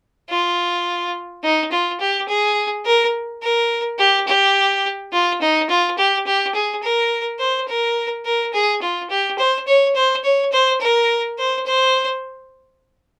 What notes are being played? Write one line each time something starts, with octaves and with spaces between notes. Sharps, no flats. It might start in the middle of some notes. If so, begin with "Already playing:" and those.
F4
D#4
F4
G4
G#4
A#4
A#4
G4
G4
F4
D#4
F4
G4
G4
G#4
A#4
C5
A#4
A#4
G#4
F4
G4
C5
C#5
C5
C#5
C5
A#4
C5
C5